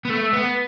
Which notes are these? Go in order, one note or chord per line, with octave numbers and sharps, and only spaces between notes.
B3
A3
B3